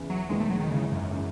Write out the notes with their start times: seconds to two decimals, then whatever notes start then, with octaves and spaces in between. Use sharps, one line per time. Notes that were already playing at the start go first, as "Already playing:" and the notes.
Already playing: E2 C#3 E3
0.10 F#3
0.29 E1 E2 D#3 G#3
0.40 A3
0.50 F#3
0.60 D#3
0.70 G#1 G#2 C#3 E3
0.91 F#2
1.11 C#3 E3